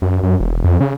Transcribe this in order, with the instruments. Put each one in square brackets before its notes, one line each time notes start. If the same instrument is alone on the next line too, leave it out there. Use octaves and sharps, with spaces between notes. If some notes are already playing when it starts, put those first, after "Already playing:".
[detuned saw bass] F#2
F#2
E1
F2
C#3